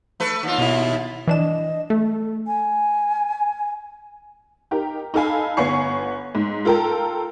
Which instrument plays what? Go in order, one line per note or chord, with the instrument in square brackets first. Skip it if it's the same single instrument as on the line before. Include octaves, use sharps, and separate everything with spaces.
[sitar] A3 B4
D#2 F4
[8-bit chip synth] B2 E4
[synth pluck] E3 D4 E7 [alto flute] D#5
[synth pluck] A3 [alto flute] A4
[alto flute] G#5
[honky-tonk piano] D#4 G4 A#4
D#4 A4 F5 G#5 B5
G1 B3 C#5 G#5 C#6 C7
G#2
F4 A4 A#4 G5